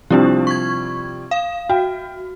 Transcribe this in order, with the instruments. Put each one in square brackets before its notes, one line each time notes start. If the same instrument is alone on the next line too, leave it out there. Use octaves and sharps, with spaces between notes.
[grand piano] C3 F3 G3 [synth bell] D4 E4 G4
[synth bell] C#6 G#6
F5
[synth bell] F#4 [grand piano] G5